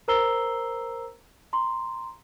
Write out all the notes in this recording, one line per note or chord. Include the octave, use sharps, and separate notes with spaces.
A#4 C5 A#5 E6 C7 G7
A#5 C6